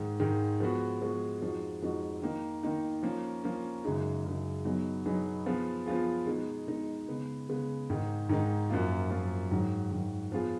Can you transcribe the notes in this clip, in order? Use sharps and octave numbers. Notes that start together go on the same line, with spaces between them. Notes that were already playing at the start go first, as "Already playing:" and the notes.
Already playing: G#2 D#3 G#3
G#2 D#3 G#3
F3 G#3 B3 F#4
F3 G#3 B3 F#4
F2 F3 G#3 D#4 F#4
F2 F3 G#3 D#4 F#4
D#3 A#3 D#4
D#3 A#3 D#4
F3 A#3 C#4
F3 A#3 C#4
F#2 C#3 G#3 D#4
F#2 C#3 G#3 D#4
B2 F#3 B3 D#4 G#4
B2 F#3 B3 D#4 G#4
F3 B3 F4 G#4
F3 B3 F4 G#4
B2 G#3 D#4
B2 G#3 D#4
C#3 G#3 B3
C#3 G#3 B3
G#2 D#3 G#3 D#4
G#2 D#3 G#3 D#4
F#2 F3 A#3 F4
F#2 F3 A#3 F4
G#2 D#3 F#3
G#2 D#3 F#3
F3 B3 F4 G#4